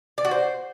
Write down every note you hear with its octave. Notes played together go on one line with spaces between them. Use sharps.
D5
F#4
C5